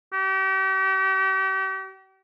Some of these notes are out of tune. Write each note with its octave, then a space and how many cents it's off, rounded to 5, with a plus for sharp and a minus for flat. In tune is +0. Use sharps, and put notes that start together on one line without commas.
G4 -40